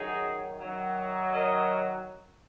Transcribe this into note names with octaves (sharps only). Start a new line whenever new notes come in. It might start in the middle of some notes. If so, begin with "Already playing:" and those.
Already playing: F#2 D#3 F#3 D#4 G#4
F#2 D#3 F#3
A#4 D#5